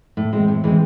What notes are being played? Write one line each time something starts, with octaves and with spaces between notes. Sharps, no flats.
A2
E3 G#3 C4
A2
E3 G#3 C4